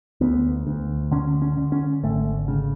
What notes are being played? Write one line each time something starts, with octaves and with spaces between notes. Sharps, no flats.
D2 B3
D2
D3 C#4
C#4
D3
C#4
G#1 A3
C#3